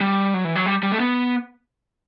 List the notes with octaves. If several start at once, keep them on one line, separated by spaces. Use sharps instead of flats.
G3
F#3
E3
F#3
G3
G3
A3
B3